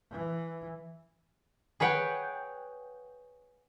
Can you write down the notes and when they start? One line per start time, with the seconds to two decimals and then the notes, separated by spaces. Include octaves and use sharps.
0.11 E3
1.80 G#4 B4 C#5 F#5 G5